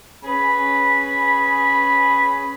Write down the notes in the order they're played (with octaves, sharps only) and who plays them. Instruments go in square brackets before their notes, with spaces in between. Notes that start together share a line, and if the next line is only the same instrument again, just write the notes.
[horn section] C#4 G#4 B4 B5